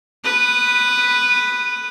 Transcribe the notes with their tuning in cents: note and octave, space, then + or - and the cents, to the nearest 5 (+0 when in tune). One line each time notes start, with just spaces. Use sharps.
B4 +0 D#6 -25